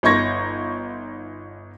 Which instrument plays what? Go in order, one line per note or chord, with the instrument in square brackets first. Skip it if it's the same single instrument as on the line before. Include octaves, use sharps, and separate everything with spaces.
[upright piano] G1 D#4 C6 C#6 G#6 A#6